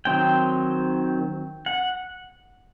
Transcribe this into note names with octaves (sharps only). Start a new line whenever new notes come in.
D#3 F#3 C4 D#4 G5
F#5